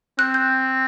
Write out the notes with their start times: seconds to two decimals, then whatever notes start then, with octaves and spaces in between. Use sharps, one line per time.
0.19 C4 F#6
0.34 G6